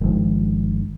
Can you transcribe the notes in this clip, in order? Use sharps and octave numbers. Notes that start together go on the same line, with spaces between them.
G1 D#3 F3 G#3